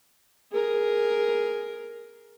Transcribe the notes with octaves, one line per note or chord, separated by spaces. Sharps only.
G#4 A#4